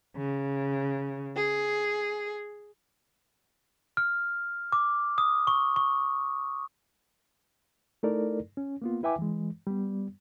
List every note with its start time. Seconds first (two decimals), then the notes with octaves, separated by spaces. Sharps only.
0.15 C#3
1.36 G#4
3.97 F6
4.72 D6
5.18 D#6
5.47 C#6
5.76 C#6
8.03 A3 D#4 E4 A4 A#4 D5
8.57 C#4
8.82 A#3 B3 F4
9.03 E4 B4 E5 G5 G#5 D6
9.19 E3 G#3
9.67 G3 B3